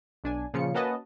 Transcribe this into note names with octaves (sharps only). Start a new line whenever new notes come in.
B1 D4 G#5
A#2 C#3 F3 F4 C#7
A#3 C#4 F#4 B4 D#5 A5